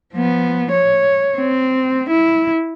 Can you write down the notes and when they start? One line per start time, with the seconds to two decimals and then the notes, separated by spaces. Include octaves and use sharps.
0.14 F3 B3
0.72 C#5
1.38 C4
2.10 E4